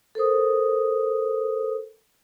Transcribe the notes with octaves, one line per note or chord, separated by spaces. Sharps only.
A4 A#4 C5 D#6